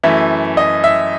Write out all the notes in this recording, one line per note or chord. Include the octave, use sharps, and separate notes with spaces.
F#2 E3 A3 E5
D#5
E5